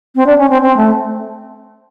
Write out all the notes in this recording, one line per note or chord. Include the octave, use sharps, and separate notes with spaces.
C4
D4
C#4
C4
C4
A3